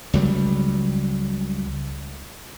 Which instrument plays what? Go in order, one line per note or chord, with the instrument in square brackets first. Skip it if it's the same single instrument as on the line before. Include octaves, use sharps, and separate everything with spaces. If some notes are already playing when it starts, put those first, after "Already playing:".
[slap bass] C#2 F#3 G3